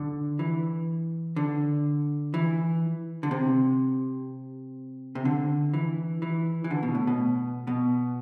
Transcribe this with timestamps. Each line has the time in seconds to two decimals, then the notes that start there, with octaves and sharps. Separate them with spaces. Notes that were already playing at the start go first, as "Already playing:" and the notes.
Already playing: D3
0.39 E3
1.36 D3
2.34 E3
3.23 D3
3.31 C3
5.15 C3
5.25 D3
5.74 E3
6.22 E3
6.64 E3
6.71 D3
6.83 B2
6.95 A2
7.07 B2
7.67 B2